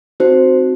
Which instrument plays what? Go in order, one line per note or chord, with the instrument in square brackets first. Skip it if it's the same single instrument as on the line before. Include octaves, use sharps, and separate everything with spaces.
[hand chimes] C4 D#4 F#4 C5